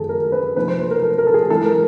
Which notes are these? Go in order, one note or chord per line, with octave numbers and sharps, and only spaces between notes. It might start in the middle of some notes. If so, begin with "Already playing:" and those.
Already playing: F#2 D#3 F#3 A3 G#4 A4
A#4
B4
C3 F3 A#3 D#4 B4
C5
B4
A#4
A4
A#4
A4
G#4
E3 G#3 C4 A4
A#4